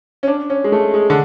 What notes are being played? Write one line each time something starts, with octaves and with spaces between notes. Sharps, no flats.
C#4
D4
C#4
G#3
A3
G#3
D3